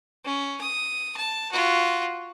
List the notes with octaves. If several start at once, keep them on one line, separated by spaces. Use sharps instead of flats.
C#4
D#6
A5
F4 F#4